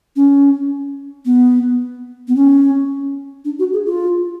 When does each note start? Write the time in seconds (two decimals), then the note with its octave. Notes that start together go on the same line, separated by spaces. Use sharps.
0.16 C#4
1.25 B3
2.28 B3
2.36 C#4
3.45 D4
3.59 F#4
3.73 G#4
3.86 F4